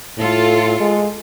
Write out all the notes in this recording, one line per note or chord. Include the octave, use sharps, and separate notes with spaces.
A2 F4 A4
G#3